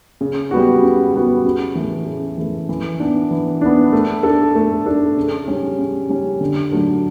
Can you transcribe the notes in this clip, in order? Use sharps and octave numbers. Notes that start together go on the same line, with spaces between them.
C#3
G3 B3 F#4
C#3
G3 B3 F#4
C#3
E3 A3
C#3
E3 A3
E3
B3 D4
E3
B3 D4
A3
D4 A4
A3
D4 A4
C#3
G3 C#4
C#3
G3 C#4
D3
F#3 A3 D4